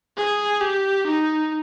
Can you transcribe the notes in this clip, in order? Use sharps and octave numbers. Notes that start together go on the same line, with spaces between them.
G#4
G4
D#4